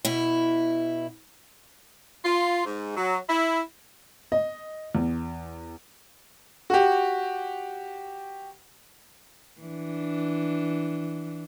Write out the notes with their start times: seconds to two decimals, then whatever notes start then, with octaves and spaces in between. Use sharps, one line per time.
0.05 B2 E4
2.25 F4
2.66 G#2
2.96 F#3
3.28 E4
4.32 D#5
4.95 E2
6.70 F#4 G4
9.61 E3 D4